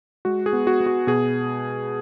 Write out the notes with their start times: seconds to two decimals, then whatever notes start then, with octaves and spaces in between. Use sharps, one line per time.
0.25 G#3 F#4
0.46 G#4
0.53 B3
0.67 F#4
0.81 B3
0.86 F#4
1.07 B2 G#4